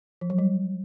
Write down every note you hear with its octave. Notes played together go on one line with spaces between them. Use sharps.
F3
F#3
G3